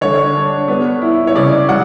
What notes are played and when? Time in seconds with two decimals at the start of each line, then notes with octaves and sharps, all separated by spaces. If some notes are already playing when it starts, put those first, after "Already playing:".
0.01 D3 C#5
0.35 D4
0.68 B3
1.02 E4
1.27 C#5
1.35 C#3 D5
1.69 F#3 F#5